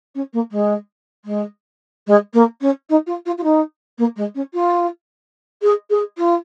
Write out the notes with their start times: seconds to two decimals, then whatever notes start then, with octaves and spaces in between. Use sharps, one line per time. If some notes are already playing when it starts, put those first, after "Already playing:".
0.15 C#4
0.33 A#3
0.51 G#3
1.25 G#3
2.07 G#3
2.33 A#3
2.61 C#4
2.89 D#4
3.06 F4
3.26 F4
3.38 F4
3.43 D#4
3.98 A#3
4.16 G#3
4.35 C#4
4.53 F4
5.62 G#4
5.90 G#4
6.18 F4